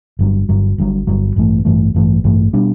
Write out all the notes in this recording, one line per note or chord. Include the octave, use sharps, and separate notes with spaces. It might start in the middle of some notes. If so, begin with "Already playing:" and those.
G1 G2 F#3
G1 G2 F#3
G1 G2 F#3
G1 G2 F#3
A1 G2 E3 A3
A1 G2 E3 A3
A1 G2 E3 A3
A1 G2 E3 A3
B2 G3 D4